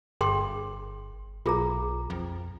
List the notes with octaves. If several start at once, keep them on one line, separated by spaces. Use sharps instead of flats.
G1 G#4 G5 C6
B1 F4 G#4 A#5
F2